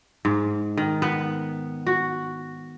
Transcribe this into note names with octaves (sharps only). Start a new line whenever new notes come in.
G#2
D#3
B3
F#4